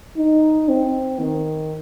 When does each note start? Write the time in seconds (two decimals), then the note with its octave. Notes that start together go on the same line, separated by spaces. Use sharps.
0.17 D#4
0.69 C4
1.19 D#3